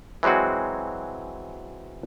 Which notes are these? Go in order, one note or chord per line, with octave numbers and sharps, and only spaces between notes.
E3 F#3 G#3 C4 F#4